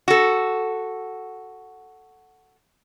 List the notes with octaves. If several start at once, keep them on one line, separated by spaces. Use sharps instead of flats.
F#4 A4